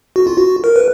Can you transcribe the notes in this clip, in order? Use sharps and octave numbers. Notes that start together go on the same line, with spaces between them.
F#4
F4
F#4
A#4
B4